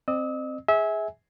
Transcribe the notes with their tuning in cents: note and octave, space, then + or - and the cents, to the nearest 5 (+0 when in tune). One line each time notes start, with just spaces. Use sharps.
C4 +0 D#5 -40 E6 -40
G#4 +0 E5 -25 G#5 +0